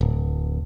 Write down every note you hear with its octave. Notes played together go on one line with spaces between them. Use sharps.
D1